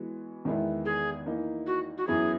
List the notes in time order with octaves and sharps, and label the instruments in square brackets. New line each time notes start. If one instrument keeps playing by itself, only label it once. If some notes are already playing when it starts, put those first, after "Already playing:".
Already playing: [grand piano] E3 G#3 B3 F#4
E2 D#3 G#3 B3 E4
[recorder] G#4
[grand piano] E3 A#3 D#4
[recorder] F#4
F#4
[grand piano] F#2 E3 B3 E4 [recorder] G#4